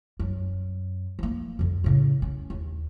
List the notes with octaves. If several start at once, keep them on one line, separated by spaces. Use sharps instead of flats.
F#2
F3 A#3
F2 D3
A2 C#3
C#4
D#2